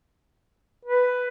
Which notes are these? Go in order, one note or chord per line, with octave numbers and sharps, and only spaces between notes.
B4